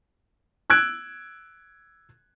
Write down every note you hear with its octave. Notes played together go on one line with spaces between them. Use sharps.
E6 F#6 G#6 D7